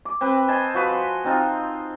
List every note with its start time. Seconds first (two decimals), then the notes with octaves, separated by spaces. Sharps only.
0.05 D6
0.21 C4 B4
0.48 C5 D#5 G#5 A5
0.74 F3 F#4 B4
0.89 C6
1.24 C4 D#4 F4